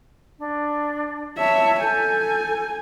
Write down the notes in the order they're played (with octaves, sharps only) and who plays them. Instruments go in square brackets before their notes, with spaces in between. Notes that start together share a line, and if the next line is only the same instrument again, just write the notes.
[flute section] D4
[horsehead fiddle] C#5 E5 [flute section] A5
[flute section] A4 G6 [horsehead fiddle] G#5